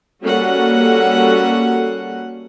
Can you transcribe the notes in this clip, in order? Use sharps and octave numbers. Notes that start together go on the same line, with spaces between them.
G3 A#3 C#4 F#4 A4 F#5